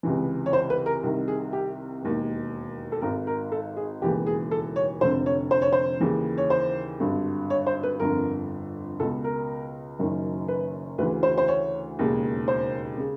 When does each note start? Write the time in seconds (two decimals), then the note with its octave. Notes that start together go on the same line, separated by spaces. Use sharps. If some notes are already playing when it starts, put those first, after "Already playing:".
0.03 C#2 C3 E3
0.46 C#5
0.53 C5
0.70 B4
0.86 A#4
1.03 C2 C3 D#3
1.28 G#4
1.53 G4
2.02 E1 D#2 D#3
2.92 A4
3.02 G#1 G#2 D#3 A#4
3.27 A#4
3.52 A4
3.77 G#4
4.01 E1 D#2 C#3 E3 G4
4.26 G#4
4.51 A4
4.76 C#5
5.01 F1 F2 D3 C5
5.26 C#5
5.51 C5
5.62 C#5
5.73 C5
6.00 D#2 C#3 E3
6.38 C#5
6.50 C5
7.00 G#1 G2 D3
7.50 C#5
7.67 C5
7.83 B4
8.00 G1 F2 D3 A#4
9.00 C#2 B2 A4
9.24 A#4
9.99 F#1 F#2 D#3
10.48 B4
10.98 D2 C#3 E3 B4
11.23 C5
11.38 C5
11.48 C#5
11.98 E1 D#2 C#3
12.48 C5
12.98 C#3